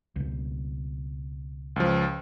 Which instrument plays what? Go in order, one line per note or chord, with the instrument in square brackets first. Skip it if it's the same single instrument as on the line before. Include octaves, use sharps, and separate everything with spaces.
[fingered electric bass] C#2 B2
[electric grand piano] C#2 F3